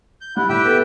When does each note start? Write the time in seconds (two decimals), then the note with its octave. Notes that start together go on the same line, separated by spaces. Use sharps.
0.21 G6
0.37 G3 E4 F#5
0.49 A2 G4 E5 G5
0.64 B3 A4